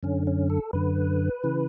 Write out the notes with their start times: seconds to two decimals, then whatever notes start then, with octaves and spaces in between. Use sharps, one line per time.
0.03 F#2 D3 C#4
0.27 C#4
0.50 A4
0.73 F#2 D3 B4
1.44 C#3 E3